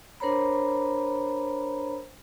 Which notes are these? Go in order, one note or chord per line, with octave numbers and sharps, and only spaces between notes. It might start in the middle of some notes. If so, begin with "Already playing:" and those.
D4 A#4 C5 C#5 A#5 B5